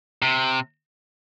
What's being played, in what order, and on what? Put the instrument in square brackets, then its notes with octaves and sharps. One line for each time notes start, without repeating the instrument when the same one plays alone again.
[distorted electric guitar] C3